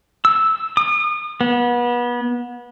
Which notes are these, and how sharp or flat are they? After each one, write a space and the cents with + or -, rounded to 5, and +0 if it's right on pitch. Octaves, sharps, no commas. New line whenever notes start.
E6 -10
D#6 -35
B3 -30